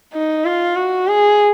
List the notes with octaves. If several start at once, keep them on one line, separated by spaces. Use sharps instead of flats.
D#4
F4
F#4
G#4